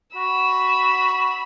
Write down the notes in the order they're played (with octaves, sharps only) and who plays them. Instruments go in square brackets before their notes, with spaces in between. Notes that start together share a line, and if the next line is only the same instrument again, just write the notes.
[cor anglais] F#4 [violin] B5 E6